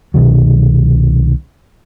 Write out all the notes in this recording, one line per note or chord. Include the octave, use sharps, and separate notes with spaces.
C2 B2 D#3 F#3